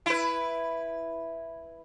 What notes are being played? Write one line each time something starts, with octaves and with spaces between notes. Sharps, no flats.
E4 B4